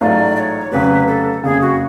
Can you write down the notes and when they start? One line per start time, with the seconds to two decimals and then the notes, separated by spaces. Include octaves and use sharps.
0.01 A1 G#2 F#3 A3 F4 D5
0.36 D5
0.40 C#5
0.71 F1 F2 C#3 F#3 B4
1.07 A4
1.43 F#1 F2 C#3 G#4
1.62 F#4